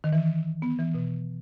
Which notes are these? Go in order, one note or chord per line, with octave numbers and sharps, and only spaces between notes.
D#3
E3
B3
E3
B2